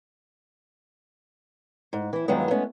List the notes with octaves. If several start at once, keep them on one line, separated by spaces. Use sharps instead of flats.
G#2
E3 E4
G2 D#3 F3 F#3 G#3 B3
G#3 A3 B3 C#4